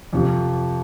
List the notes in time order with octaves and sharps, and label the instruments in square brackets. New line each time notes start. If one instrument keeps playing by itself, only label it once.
[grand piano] F2 C3 F3